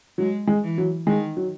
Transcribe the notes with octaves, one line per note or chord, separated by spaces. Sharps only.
F#3 G#3
G#3
E3
F#3
D#3 G#3
F#3